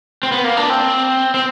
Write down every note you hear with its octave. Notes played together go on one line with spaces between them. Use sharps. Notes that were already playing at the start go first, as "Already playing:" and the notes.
C4
B3
A#3
D4
C4
C4